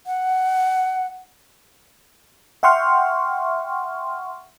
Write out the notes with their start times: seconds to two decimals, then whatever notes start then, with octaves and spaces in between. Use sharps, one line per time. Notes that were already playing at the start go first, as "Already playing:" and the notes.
0.07 F#5
2.63 E5 F#5 G5 C6 C#6 F6